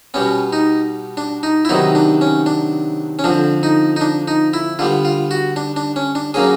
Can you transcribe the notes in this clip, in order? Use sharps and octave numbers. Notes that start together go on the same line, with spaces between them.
B2 G3 B3 C#4
D#4
D4
D#4
E4
C3 D#3 F#3 B3 D#4
D4
C#4
D4
C#4
F2 D3 F3 D4
D#4
D#4
D4
D#4
E4
D3 G3 B3 F4
F4
F#4
D4
D4
C#4
D4
C#3 F#3 A#3 C#4 G#4